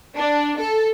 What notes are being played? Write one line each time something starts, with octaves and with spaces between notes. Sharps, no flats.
D4
A4